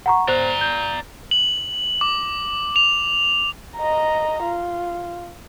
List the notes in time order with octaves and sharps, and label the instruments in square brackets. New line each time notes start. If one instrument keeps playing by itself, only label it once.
[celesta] F#5 A#5 C#6
[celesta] C5 F#6 [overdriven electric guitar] D5 A#5
[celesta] G6
[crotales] F#7
D6
F7
[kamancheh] D#5 A#5
F4